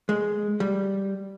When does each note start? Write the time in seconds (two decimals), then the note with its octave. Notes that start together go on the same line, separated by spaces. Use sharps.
0.09 G#3
0.60 G3